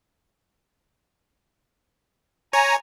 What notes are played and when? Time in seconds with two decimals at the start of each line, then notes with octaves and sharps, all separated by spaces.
2.53 C#5 G#5 A#5